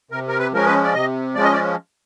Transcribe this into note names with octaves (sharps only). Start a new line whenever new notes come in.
C3 A#4
A#4
B4
F3 G#3 C#4 A#4
B4
D5
C3 D#5
F3 G#3 C#4 D5
D#5
D5